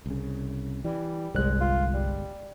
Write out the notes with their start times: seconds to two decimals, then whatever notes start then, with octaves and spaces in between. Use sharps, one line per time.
0.06 C2 C#3
0.84 E3 G3
1.35 G1 C2 G#3 F#6
1.60 F4
1.94 G3